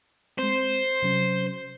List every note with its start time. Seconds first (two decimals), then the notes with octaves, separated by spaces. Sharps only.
0.39 G#3 C4 C5
1.02 C3 F#3 C#4